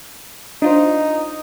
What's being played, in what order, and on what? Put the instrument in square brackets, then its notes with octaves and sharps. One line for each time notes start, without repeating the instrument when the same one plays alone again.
[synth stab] D4 F4 C5 [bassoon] D#4